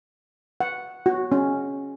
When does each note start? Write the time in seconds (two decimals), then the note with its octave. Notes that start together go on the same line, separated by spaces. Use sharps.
0.61 F#5
1.06 F#4
1.32 C#4